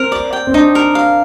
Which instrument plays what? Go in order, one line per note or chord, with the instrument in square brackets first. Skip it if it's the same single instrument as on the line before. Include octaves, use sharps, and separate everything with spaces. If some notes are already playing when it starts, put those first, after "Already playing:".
Already playing: [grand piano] C4 [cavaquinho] A#4
[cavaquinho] D5
G5
[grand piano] C4
[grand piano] D4 [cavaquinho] D#4
[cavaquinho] A#4
F5